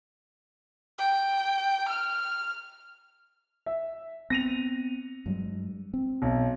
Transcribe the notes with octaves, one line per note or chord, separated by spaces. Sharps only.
G5
F6
E5
B3 C4 A#6 D#7 F7
G2 F#3 G#3
C4
B1